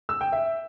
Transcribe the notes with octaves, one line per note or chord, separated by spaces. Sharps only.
E6
G5
E5